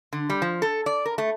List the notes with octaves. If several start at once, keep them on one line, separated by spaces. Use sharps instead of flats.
D3
G3
F3
A4
D5
A#4
A3